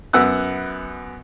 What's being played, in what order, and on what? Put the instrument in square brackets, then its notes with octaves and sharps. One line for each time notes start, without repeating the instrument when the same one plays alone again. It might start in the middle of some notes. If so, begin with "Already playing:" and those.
[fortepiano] F#2 B3 F#5 E6 F#6